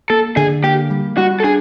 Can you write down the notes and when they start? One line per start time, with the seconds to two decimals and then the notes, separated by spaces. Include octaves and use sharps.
0.10 A#3 A4
0.37 D3 G#4
0.63 A#3 G4
0.90 G3
1.17 G3 F#4
1.40 A4
1.44 D4 G#4